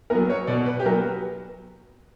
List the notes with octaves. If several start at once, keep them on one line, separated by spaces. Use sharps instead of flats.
F#3 B3 A#4
C#5
B2 D5
B4
G4
F#3 B3 A#4